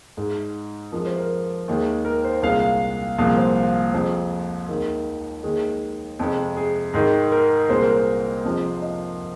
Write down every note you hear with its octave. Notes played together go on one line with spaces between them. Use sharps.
G#2 G#3
F2 F3 G#3 A#4
C5
A#4
D#2 D#3 G#3
A#4
C5
C2 A#2 G#3 F5
F5
C2 A#2 F3 G#3 F5
C5
F2 F3 G#3 C5
D#2 D#3 G#3 A#4
D#2 D#3 G#3 G#4
F2 C3 G#3
G#4
G#2 D#3 G#3
A#4
C2 A#2 G#3 C5
A#4
C5
F2 C3 F3 G#3
D#5